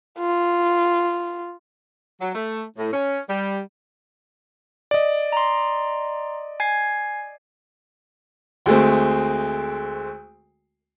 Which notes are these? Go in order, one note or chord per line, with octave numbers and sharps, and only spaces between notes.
F4
F#3
A3
A2
C#4
G3
D5 D#5
A#5 C6
G#5 G#6 C7
D2 G#3 A3 C4